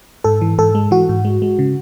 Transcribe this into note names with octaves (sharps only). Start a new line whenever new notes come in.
G#2 A4
E3
G#2 A4
G#3
E3 F#4
G#2
G#3
G#3
C#3